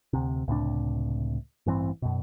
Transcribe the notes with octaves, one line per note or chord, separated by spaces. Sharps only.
D2 C3
C#2 A2 C3 D4
A1 G2 E3 C4
F#2 B2